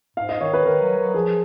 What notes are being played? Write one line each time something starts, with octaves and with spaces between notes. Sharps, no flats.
G#2 F5
D#5
D#3 C#5
B4
D#3 A#4
F#3
F#3
F3 G#4